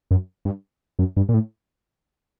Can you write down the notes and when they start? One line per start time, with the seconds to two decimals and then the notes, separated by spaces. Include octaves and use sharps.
0.11 F#2
0.45 G2
0.99 F#2
1.17 G2
1.29 A#2
1.34 A2